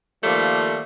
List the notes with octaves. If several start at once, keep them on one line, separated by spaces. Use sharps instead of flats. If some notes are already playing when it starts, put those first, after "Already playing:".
D#3 F3 G3 A3 A#3